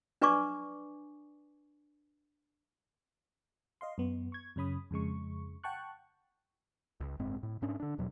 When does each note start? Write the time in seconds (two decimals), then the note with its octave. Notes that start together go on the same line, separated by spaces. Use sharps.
0.22 D4 B4 D5 G#5 C#6 D6
3.81 D#5 F5 C6
3.98 F#2 B3
4.32 C#6 G#6
4.56 F#2 C#3 C#4 B5 D#6
4.91 F2 C#3 G#3 C#6
5.64 F#5 G5 A5 C#6 F#6
7.00 C#2
7.19 F#1 G#2 C4
7.43 A2
7.62 G#2 C#4 D4
7.80 D3 D4
7.98 E2 B2 F#3